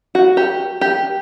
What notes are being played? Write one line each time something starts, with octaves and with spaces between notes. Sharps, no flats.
F#4
G4
G4